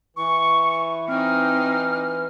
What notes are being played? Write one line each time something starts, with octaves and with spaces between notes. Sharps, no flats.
E3 C#6
C4 D#4 F6